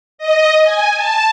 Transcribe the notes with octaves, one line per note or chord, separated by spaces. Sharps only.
D#5
G#5
A5